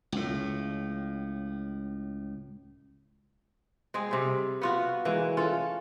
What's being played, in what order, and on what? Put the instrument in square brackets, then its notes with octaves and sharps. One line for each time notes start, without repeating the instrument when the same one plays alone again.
[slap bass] C#2 A2
[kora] G#3 C4 G#4
C3 G3
B3 F4 F#4
E3 G#3 A#3
C#4 F4 A4